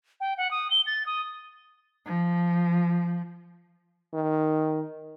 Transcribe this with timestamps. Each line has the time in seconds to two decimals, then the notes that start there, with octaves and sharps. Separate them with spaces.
0.21 G5
0.38 F#5
0.51 D#6
0.71 G7
0.87 A6
1.06 D#6
2.07 F3
4.13 D#3